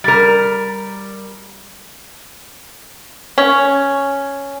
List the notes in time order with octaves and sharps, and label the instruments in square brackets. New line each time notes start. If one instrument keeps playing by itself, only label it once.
[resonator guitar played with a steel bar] G3 A#4
[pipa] C#4